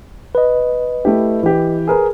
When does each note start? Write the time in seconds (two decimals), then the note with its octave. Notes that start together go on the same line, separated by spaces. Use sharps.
0.35 B4 D#5
1.05 A3 E4 G4
1.43 E3 G4
1.88 G#4 A#4 B4